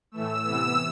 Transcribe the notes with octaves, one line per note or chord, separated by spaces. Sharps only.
A2 E3 A3 E6
C3 E3 B3